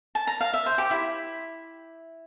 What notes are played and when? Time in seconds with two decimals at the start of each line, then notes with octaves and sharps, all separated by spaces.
0.15 A5
0.27 A#5
0.41 F5
0.53 E5
0.66 C5
0.78 G4
0.91 E4